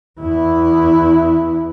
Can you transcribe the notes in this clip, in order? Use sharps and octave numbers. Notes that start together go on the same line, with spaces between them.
E2 E4